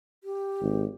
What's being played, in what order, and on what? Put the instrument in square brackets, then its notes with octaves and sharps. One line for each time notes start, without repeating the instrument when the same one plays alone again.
[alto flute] G4
[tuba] G#1